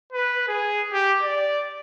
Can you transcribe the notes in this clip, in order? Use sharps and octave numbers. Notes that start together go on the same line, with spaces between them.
B4
G#4
G4
D5